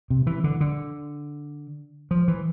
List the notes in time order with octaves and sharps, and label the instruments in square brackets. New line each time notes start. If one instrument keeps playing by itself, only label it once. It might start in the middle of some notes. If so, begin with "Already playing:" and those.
[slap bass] C3
E3
D3
D3
F3
E3